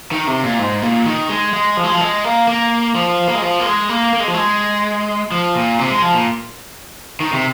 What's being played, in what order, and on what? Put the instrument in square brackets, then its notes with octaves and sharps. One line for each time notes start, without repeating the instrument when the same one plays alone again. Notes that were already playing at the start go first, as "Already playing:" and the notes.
[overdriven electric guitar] D#3
C3
A#2
G#2
A#2
D#3
G#3
G#3
F3
G#3
F3
G#3
A#3
A#3
F3
A#3
G#3
F3
A#3
G#3
A#3
A#3
G#3
F3
G#3
F3
A#2
C3
G#3
F3
A#2
D#3
C3